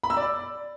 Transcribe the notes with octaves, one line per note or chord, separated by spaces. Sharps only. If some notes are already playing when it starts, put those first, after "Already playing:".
B5
E6
D5